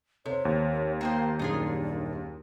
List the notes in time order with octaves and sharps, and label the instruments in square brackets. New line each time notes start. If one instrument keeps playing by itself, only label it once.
[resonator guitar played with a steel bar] C3 [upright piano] A4 C5 [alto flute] C#5
[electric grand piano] D#2
[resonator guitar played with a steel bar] A#3 D#4 C5 [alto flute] G5
[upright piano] D#1 F#2 [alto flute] D4 [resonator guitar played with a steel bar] D#4 F4 G#4